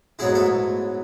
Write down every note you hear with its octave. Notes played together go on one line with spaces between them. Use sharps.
G#2 F#3 B3 E4 G#4
A3 A4